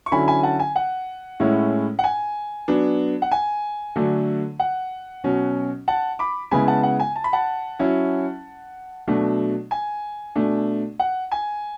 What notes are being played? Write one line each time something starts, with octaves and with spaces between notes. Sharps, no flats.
C#6
D3 F#3 C#4 E4 G#5 B5
G#5 B5
F#5 A5
G#5
F#5
A2 G#3 C#4 E4
F#5
G#5
F#3 B3 D4
F#5
G#5
D3 F#3 A3 D4
F#5
B2 F#3 C#4
F#5 A5
B5 D6
C#3 G#3 B3 E4 G#5 B5
F#5 A5
F#5
G#5
A5
B5
F#5 A5
F#3 C#4 E4
B2 F#3 A3 D4
G#5
B2 A3 D4
F#5
G#5